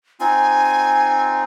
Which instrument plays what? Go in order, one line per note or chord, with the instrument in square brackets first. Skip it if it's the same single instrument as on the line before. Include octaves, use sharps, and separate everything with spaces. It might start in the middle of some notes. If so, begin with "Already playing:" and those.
[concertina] C4 D#4 F4 [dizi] G#5